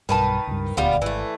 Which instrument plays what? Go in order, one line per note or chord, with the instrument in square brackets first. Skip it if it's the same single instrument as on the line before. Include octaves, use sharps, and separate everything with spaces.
[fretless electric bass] B1 G2 [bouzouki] D#3 B4 A5
[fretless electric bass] C#2 G2
[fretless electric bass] D#1 D2 [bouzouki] G3 B3 F4
[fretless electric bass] G#1 [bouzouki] E3 A3